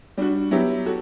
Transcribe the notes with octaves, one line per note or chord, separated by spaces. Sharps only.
G3 D4 F#4
F#3 B3 E4 G4
F#4 A4